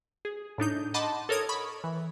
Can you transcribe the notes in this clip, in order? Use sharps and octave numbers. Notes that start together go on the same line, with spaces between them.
G#4
A2 D4 D#4 G6
D#5 F#5 A5 B5 C6 D6
A4 A#4 C#5 D#6 G#6
B5 C#6
E3